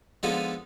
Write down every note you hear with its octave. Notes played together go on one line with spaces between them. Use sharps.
D3 F3 G#3 B3 D#4